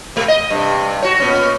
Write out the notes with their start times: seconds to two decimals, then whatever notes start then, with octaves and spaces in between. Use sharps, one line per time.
0.16 C3 A3
0.28 D#5
0.50 G2 C3
1.02 F#4 C#5
1.20 A#2 B3 C#4